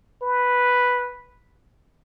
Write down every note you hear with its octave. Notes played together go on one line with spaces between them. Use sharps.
B4